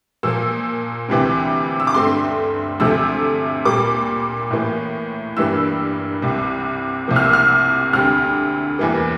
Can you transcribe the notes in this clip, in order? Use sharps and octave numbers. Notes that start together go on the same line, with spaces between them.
A#2 F3 A#3 E6
D2 C3 E3 G3 C4
E6
D6
G2 D3 A3 C4 C6
D2 C3 F3 A3 E6
A#2 G3 A#3 D6
A2 E3 A#3
G2 E3 G3 A#3 E6
C2 C3 G3
C2 C3 F3 A#3
F6
E6
F6
D2 D3 G3 C4 F6
E2 E3 G3 A#3